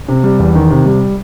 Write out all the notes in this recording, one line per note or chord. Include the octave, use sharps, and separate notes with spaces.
C3
G3
E2
D#3
C3
G3